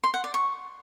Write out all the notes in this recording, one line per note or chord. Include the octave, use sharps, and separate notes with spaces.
C6
F#5
D5
C#6